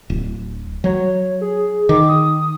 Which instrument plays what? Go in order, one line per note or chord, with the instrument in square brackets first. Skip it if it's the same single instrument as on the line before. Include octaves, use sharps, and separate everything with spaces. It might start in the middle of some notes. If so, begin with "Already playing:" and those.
[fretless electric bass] D1
[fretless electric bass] F#3 [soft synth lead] C#5
[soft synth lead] G#4
[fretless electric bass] D#3 [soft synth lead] D6
[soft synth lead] D#6